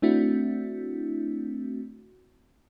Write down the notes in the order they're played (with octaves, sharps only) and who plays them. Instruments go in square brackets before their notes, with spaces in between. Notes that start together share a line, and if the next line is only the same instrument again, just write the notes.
[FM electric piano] A3 C4 D4 E4 F#4